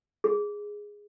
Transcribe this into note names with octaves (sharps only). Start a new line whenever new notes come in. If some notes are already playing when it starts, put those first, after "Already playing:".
G#4